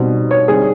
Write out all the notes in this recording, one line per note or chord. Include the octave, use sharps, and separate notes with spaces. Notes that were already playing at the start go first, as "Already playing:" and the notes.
Already playing: B2 G3 C4 D#4
C#5
D3 G3 C4 D#4 G#4